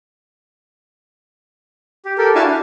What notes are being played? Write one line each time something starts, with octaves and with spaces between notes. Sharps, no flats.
G4
G4 A4 A#4
D4 E4 F#4 F5 G#5 A5
D4